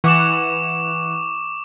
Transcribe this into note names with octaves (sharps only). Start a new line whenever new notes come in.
E3 F#5 C#6 D6 E7